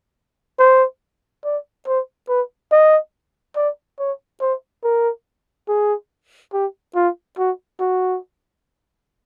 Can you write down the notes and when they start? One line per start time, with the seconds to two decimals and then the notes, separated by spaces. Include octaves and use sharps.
0.59 C5
1.44 D5
1.87 C5
2.29 B4
2.72 D#5
3.56 D5
3.99 C#5
4.41 C5
4.84 A#4
5.68 G#4
6.53 G4
6.95 F4
7.38 F#4
7.80 F#4